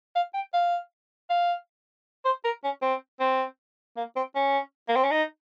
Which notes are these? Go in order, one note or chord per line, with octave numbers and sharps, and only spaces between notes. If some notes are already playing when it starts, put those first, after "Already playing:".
F5
G5
F5
F5
C5
A#4
C#4
C4
C4
A#3
C4
C#4
A#3
C4
C#4
D#4